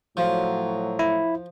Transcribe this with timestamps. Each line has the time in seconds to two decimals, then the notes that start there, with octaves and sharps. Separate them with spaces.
0.17 A2 F3 F#3
0.99 E4